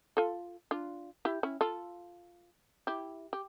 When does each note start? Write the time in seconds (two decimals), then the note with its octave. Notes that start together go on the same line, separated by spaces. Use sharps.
0.17 F4 A4
0.71 D4 F4
1.25 E4 G4
1.43 C#4 E4
1.61 F4 A4
2.87 E4 G4
3.33 G4